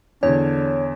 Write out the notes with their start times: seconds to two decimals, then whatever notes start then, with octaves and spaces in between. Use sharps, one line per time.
0.23 E2 D3 C#5